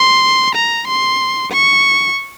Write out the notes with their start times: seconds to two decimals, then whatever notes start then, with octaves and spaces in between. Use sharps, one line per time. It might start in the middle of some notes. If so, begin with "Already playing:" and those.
Already playing: C6
0.55 A#5
0.87 C6
1.52 C#6